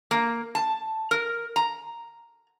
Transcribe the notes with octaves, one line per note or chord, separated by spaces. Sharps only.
A#3
A5
A#4
A#5